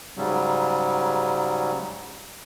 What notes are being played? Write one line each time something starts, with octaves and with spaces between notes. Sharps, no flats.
G#2 C#3 F#3 G3